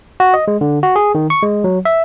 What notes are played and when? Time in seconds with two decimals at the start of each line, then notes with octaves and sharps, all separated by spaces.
0.20 F#4
0.34 D#5
0.48 G#3
0.61 D3
0.83 F#4
0.96 G#4
1.15 D#3
1.30 C#6
1.43 G#3
1.64 F#3
1.85 E5